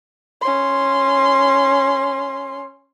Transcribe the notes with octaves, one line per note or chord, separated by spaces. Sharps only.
C#4 C6